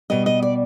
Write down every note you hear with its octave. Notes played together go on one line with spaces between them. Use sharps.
B2 G3 D#5
D#5
D5